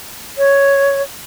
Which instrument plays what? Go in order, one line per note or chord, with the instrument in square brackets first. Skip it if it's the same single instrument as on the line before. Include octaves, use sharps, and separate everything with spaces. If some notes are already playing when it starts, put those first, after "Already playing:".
[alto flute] C#5